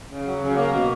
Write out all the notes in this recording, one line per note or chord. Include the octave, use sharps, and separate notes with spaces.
C#3
F#3
C#3
A#3
B2